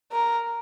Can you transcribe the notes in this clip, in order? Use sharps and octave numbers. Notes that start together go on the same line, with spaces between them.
A#4